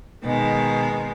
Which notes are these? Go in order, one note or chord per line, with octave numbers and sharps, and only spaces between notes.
B2 D#3 G#3